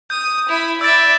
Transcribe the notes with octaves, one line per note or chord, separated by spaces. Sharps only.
D#6 G6
E4 B5
D5 E5 E6 A6